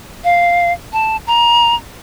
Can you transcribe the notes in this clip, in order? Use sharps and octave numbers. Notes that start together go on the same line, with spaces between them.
F5
A5
A#5